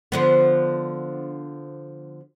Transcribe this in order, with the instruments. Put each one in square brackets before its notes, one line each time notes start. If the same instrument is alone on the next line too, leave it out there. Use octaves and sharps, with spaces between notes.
[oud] D3 F3 B3